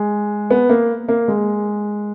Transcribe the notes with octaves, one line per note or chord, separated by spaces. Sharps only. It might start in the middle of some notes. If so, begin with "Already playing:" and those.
Already playing: G#3
B3
A#3
A#3
G#3